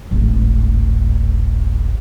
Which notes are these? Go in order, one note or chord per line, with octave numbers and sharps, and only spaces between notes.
D1 G#1